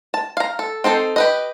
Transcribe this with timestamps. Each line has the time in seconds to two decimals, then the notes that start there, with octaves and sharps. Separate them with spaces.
0.14 A5
0.37 F5 A#5
0.59 A4
0.84 C4 D#4 A4 C5
1.16 G4 B4 D#5